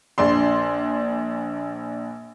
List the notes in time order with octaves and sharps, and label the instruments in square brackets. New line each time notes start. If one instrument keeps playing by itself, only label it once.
[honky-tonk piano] A#1 D4 C6